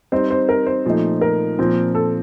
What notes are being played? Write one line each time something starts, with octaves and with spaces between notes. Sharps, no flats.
G3 C4 D#4 C5
C5
A#4
C5
A#2 F3 A3 D#4
A#4
A#2 F3 C4
A4